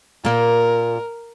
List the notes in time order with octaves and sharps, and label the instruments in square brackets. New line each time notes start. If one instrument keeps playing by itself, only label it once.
[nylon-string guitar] A#2 A#3 [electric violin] A#4